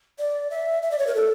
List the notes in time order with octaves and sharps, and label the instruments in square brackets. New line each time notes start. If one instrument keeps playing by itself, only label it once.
[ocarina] D5
E5
E5
D5
C#5
A#4
A4